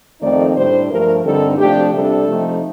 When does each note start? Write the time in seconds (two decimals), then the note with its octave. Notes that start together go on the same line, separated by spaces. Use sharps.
0.20 F2 D#3 A3 C4 D#4 D5
0.55 A2 G3 D4 C5
0.89 G2 F3 A3 A#4
1.24 G2 D3 G3 C4 D#4 A4
1.58 C3 F3 A3 D4 G4
1.93 C3 G3 D4 A4
2.27 C3 F3 A3 D#4